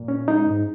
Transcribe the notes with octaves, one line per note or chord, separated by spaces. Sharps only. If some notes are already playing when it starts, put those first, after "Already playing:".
Already playing: A#2
C#4
G#3 D#4
G#2